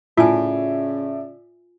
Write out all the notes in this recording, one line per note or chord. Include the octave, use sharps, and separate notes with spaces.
A2 C#3 F4 D5 E5 G#5